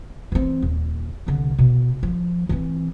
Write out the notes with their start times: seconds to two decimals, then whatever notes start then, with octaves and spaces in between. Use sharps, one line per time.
0.32 E3 C4
0.62 D#1
1.27 C2 D3
1.58 B2
2.03 F3
2.49 E3 C4